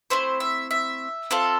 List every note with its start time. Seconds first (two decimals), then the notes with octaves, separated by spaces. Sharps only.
0.10 A3 C4 E4 C5
0.40 E5
0.71 E5
1.31 C4 F4 A4